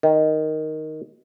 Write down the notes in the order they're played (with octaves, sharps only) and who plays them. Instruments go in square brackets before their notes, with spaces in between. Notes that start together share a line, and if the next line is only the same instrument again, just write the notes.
[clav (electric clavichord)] D#3